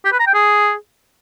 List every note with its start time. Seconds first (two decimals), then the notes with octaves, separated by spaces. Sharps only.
0.05 G4
0.12 B4
0.19 A#5
0.27 G5
0.34 G#4